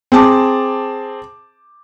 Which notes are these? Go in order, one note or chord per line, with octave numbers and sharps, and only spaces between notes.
C4 G#4 A5 D6